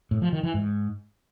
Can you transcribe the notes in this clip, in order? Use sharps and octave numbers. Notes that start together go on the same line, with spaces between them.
A2
F3
D#3
E3
G#2